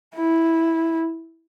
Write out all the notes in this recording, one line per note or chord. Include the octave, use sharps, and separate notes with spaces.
E4